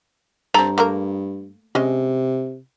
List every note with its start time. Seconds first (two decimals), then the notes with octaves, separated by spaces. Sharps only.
0.54 G2 C4 A4 A#5
0.78 A3 A#3 A#4
1.75 C3 G#3 C#4 D#5